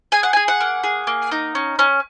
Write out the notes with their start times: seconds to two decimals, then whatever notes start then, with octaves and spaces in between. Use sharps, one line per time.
0.12 G#4 G#5
0.23 F#5
0.33 G#4 G#5
0.48 F#5
0.61 A#3
0.83 G#4
1.07 A#3
1.31 D#4
1.55 C#4
1.79 C#4